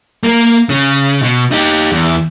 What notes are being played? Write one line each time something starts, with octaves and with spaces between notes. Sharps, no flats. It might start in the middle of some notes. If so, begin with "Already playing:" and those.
A#3 A#4
C#3
B2
D#4 G4
E2